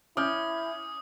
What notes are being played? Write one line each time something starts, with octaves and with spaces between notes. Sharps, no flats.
C#4 E4 D6 D#6 F6 G6